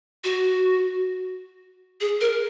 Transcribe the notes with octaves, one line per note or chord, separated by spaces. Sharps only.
F#4
G#4
A#4